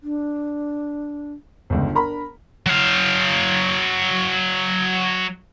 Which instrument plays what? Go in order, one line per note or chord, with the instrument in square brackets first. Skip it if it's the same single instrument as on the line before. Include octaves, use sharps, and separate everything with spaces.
[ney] D4
[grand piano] G1 C#2 [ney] D4
[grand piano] A#4 A#5 B5
[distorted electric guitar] F#3 F5